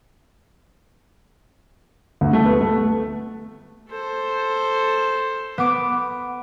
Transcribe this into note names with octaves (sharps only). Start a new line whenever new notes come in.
D2
A3
B3
A3
A4 C5
B3 D6